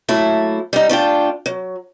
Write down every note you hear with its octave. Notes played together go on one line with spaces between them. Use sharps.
F#3 A3 A#3 E4
G3 D#4
A3 D4 F4 G5
F#3